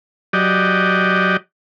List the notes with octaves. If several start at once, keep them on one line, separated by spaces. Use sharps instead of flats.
F#3 G4 D5 D#5